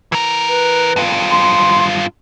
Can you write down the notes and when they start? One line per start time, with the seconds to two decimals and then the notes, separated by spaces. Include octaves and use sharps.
0.12 E3 A#4
0.47 B4
0.96 G2 F4
1.30 C6